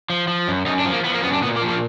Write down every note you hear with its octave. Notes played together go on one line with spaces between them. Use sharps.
F3
F3
F#2
F#2 D#4
D4
F3
A#3
F3 B3
A#3
F#2 B3
D4
A#2 B3
A#3
F3
A#3